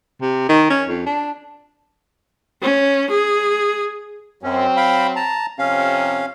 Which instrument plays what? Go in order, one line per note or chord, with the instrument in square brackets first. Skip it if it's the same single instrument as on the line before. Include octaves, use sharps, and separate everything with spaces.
[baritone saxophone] C3
D#3
C#4
F2
D4
[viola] C#4
G#4
[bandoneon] F#2 C#4 [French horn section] F#3 C4
[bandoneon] F5 G5 B5
A5 A#5
[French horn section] F2 C3 [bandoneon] C#4 F5